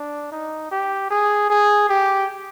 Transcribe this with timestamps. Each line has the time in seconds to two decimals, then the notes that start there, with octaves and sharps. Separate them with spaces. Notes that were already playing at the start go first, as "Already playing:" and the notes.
Already playing: D4
0.32 D#4
0.71 G4
1.11 G#4
1.50 G#4
1.89 G4